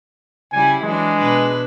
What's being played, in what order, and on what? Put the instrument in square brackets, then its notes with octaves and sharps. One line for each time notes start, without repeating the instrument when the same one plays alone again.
[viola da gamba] C#3 G3 E4 [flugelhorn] G#5
[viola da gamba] E3 F#3 D4 [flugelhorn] G#3
[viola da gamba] B2 D4 B4